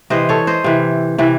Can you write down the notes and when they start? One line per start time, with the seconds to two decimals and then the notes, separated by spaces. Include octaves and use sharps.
0.10 C3 E3 C5 D#5
0.29 A4 C#5
0.47 C5 D#5
0.64 C3 E3
1.18 C3 E3